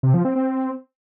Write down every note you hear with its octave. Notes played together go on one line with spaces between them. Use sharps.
C3
F3
C4
C4